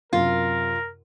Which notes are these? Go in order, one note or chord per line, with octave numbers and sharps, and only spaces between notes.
F#2 C3 F4 A#4